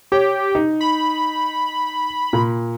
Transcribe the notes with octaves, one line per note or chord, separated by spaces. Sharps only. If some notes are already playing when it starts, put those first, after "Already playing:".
G4 C#5
D#4
B5
A#2